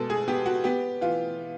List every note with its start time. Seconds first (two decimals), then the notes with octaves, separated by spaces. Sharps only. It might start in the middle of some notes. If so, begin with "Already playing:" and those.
Already playing: B2 G#3 A4
0.10 G#4
0.28 B3 G4
0.46 F#4
0.64 B3 G4
1.01 E3 F4